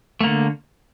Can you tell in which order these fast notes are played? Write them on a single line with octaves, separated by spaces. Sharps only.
A3 A#3 D3